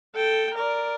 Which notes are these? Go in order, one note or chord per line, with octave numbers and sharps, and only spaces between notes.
A4 G5
A#4 D5